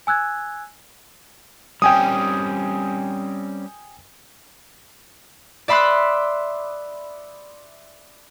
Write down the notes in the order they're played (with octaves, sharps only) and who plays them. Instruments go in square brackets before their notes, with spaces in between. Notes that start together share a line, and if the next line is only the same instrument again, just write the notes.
[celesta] G#5 E6 F#6 G#6
[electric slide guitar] G3 C4 C#4 [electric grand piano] G5 G#5 D#6
[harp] D5 E5 B5 C6 D#6 F#6